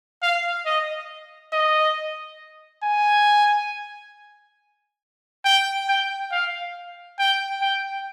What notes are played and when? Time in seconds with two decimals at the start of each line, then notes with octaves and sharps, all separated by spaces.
0.22 F5
0.66 D#5
1.53 D#5
2.83 G#5
5.44 G5
5.88 G5
6.32 F5
7.19 G5
7.61 G5